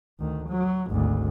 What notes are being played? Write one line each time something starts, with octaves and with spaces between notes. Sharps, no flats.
D2 D#3
F#3
G#1 D2